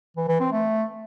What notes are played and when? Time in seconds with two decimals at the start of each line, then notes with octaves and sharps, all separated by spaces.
0.17 E3
0.28 E3
0.40 C4
0.52 A3